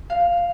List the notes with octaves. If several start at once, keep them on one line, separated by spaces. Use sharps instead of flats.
F5